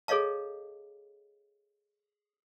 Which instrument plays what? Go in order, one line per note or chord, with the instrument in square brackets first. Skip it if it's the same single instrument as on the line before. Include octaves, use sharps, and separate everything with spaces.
[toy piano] G#4 A4 C#5 D#5 F5 A5